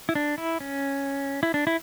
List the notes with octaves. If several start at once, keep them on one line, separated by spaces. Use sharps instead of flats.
E4
D4
E4
C#4
E4
D4
E4